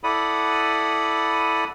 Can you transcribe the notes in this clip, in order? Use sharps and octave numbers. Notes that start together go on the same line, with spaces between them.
E4 A4 D5 F#5 B5 D#6